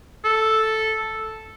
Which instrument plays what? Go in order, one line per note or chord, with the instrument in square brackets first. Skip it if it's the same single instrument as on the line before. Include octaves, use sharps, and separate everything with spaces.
[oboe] A4